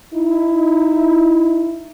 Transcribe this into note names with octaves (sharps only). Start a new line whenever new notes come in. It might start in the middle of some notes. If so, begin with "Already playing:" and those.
D#4 E4